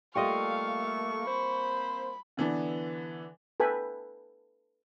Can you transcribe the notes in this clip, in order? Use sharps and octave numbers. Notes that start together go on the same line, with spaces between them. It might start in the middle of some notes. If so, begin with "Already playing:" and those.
G3 A3 A#3 F4 D#5 F5 C#6
A#3 C4 C5 B5
D3 E3 B3 D4
A4 B4 G5 G#5 B5